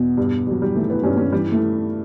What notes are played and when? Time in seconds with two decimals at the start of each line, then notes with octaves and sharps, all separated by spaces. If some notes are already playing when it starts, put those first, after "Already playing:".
Already playing: E2 B2
0.18 G2
0.47 G2 F#3
0.62 G3
0.75 E3 A3
0.90 B3
1.03 G2 C#4
1.17 C#4
1.32 E3 G3
1.52 A3